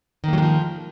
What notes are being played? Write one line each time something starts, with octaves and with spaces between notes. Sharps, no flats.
D#3 F3 F#3 G#3 A#3